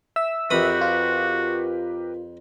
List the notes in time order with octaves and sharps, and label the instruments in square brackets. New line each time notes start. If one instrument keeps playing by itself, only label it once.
[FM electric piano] E5 E6
[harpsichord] F2 B5 D#6 [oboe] F#4 [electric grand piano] G4 A#4 B4
[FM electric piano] F4